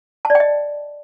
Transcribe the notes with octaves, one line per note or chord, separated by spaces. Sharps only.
A5
D5
G5
D#5